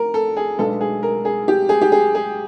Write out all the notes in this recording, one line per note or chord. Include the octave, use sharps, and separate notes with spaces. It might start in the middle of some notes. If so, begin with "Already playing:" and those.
Already playing: A#4
A4
G#4
B1 B2 G#3 B3 D4 A4
G#4
A#4
G#4
G4
G#4
G4
G#4
G#4